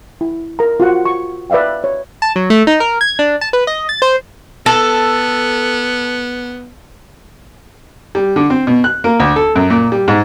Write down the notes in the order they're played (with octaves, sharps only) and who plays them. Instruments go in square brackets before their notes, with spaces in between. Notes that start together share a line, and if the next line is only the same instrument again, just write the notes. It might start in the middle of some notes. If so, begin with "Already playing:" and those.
[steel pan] E4
A#4 A#5
F4 F#4 F#5
C#6
B4 D5 E5 F5 G5
C#5
[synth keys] A5
F#3
A3
D#4
A#4
G#6
D4
A5
B4
D#5
A6
C5
[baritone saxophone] B3 [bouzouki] A4
[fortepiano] G3
D3
C4
B2
F#6
A#3
D2
A4
F#2
A#2
G3
G#2